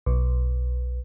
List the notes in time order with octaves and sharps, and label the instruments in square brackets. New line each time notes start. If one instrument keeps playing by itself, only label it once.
[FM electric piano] B1